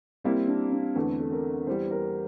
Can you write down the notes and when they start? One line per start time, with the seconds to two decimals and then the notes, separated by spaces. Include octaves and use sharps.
0.24 G3 A#3 C4 E4
0.48 D4
0.72 D4
0.96 E2 D3 A3 A4
1.20 A4
1.32 A#4
1.67 E2 E3 G3 C5
1.91 A#4